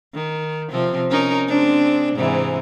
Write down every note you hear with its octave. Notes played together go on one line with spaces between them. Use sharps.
D#3
C3 F3 C4
C#4 D#4 A#4
G#3 C4 D4
G#2 C3 E3